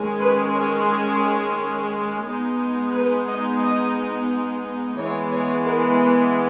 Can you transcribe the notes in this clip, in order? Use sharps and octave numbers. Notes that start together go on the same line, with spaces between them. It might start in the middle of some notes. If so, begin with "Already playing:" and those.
Already playing: D#3 G#3 C#4
B4
C#5
G#4
G#3 B3 D#4
B4
D#5
D#5
E3 G#3 B3 C#5
C#5
A#4
B4